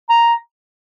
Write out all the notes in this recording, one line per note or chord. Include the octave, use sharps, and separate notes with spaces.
A#5